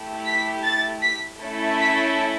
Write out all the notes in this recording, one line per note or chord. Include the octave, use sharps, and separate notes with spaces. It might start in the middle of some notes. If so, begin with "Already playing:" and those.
Already playing: A3 E4 G4
B6
A6
B6
A3 C#4 E4 A4
B6